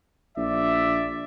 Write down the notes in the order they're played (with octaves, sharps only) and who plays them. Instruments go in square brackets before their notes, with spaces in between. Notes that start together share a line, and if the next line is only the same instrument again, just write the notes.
[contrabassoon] A#1 [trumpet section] D5 E5